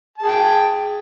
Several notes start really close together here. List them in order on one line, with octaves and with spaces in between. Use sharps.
A5 G#4 G5